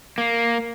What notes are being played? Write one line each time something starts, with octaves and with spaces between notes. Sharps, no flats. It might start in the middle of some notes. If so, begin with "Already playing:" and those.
A#3